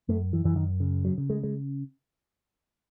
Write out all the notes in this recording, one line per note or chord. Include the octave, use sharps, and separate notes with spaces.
F#2 A3
E3
F#2 E3
D#3
C#3
F#3
C#3
G#3
G#3